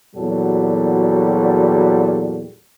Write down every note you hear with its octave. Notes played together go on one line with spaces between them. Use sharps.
E2 A#2 F#3 G3 F#4 A4